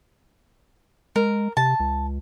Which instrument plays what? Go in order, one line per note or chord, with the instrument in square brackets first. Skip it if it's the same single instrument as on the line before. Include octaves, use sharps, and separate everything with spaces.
[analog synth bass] G#3 [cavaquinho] A#4
[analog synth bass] C3 [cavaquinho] A5
[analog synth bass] C#2